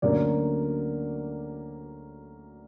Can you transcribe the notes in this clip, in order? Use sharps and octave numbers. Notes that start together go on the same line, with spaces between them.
D2 D3 F#3 A#3 C#4 D5